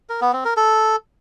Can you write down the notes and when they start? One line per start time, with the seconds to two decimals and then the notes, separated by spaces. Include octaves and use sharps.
0.09 A#4
0.21 B3
0.33 C4
0.45 A#4
0.57 A4